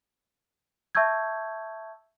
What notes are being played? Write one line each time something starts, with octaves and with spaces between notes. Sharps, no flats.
E5 A5 C#6 E6 G6 G#6